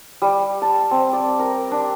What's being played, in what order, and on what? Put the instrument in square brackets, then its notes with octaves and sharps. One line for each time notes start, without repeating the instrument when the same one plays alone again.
[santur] G3
A5
C4
D5
A#4
D4